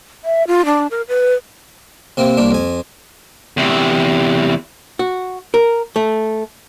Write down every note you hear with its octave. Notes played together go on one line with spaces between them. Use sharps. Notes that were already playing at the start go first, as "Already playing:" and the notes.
E5
F4
D4
A#4
B4
C3 A#3 C4
C2 A#3 D4
F2 G#5
E2 C3
F#4
A#4
A3